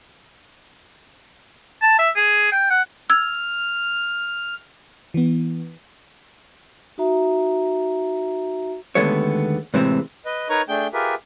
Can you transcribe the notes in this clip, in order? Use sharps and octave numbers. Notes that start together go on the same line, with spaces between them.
A5
E5
G#4
G5
F#5
E6 F6 G#6
E3 B3
D#4 F#4 E5 A#5
D#2 D3 G#3 A3 B3 C#5
A2 C3 E3 G#3 C4
B4 D#5
D#4 A#4 B4 C#5 A#5 C#6
A3 D4 G#4 G5 G6
F4 G4 G#4 A#4 B4 E5